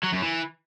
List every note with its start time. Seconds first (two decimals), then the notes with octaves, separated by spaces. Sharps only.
0.04 F#3
0.13 F#2
0.22 E3